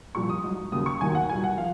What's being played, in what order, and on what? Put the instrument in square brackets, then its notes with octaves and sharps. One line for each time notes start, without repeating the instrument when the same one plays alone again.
[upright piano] C2 A#2 F3 C#6
D#6
G#2 F#3
D#2 C#3 F#3 D#6
C#6
D#2 D#3 F#3 G#5
F#5
C2 A#2 F#3 G#5
F#5
F3 F5